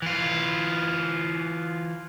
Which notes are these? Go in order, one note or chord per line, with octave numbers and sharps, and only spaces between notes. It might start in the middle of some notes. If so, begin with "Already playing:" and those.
E3 F4